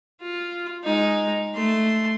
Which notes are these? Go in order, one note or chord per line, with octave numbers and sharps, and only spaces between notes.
F4
G#3 D#4
A3 C6